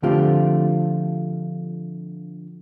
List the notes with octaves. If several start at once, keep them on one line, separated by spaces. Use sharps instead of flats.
D3 F3 A3 C4 F4 G4